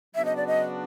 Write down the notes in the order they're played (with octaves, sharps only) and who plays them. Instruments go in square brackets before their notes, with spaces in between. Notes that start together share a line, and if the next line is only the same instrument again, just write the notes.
[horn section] C#3 F#3 B3 D4 F#4 [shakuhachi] E5
[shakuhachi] D#5
D5
D#5